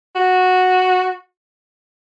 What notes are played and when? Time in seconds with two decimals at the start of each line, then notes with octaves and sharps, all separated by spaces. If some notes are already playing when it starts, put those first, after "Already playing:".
0.15 F#4